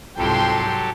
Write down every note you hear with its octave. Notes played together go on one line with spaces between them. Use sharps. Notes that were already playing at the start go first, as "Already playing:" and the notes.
C2 F2 G#2 F#3 G4 A4 G5 C6